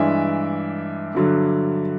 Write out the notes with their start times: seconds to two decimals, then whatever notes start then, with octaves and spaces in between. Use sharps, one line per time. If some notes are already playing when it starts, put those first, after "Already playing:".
Already playing: G2 E3 G#3 D5 E5
1.15 G2 D3 F#3